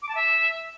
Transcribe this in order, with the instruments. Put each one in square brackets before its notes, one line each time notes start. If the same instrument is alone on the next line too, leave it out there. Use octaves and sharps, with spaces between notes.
[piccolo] D6
A5
E5